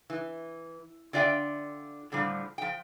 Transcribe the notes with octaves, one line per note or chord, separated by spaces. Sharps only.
E3
D3 F4 D5 E5 G5
A2 D3 F3 G3
F3 G5